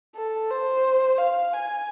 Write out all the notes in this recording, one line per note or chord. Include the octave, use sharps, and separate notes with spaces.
A4
C5
F5
G#5